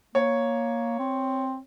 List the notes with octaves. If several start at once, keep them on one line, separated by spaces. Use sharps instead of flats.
A#3 C#5
C4